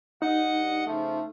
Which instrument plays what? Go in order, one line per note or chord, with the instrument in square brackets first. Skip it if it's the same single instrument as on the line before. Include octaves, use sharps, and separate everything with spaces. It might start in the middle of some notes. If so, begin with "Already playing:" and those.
[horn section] G2 D#5 [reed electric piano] D#4 [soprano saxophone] F#5
[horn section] C#3 F3 [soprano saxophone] A3